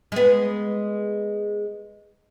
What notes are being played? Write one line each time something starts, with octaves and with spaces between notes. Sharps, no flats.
G#3 B3